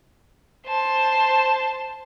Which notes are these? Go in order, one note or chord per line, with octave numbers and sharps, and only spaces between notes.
C5 A5